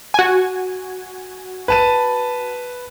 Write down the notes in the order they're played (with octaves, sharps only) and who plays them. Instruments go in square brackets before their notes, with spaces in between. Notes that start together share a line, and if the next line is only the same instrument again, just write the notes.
[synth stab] F#4 G#5
[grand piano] B4 A5 D#7